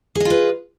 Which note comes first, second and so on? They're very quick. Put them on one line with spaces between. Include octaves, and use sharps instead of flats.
G#4 D#5 F4 B4